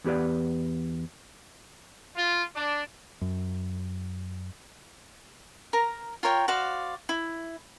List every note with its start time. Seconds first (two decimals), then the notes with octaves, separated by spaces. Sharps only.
0.04 E2 B3 G4 B4 D5
2.15 F4
2.54 D4
3.21 F#2
5.73 A#4 A#5
6.23 F4 A#4 C#5 G5
6.48 F#4 C5 D5 F5
7.09 E4